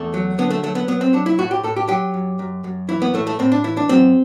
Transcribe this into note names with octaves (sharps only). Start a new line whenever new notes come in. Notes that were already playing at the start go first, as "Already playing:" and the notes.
Already playing: E2 A3
F#3
D3 B3
A3
F#3 A3
B3
F#3 B3
C4
F#3 D4
E4
A2 F#4
G4
A2 A4
G4
F#3 G4
F#2
F#2
F#2
E3 E4
B3
A2 A3
A3
A2 C4
D4
E3 E4
D4
F#2 C4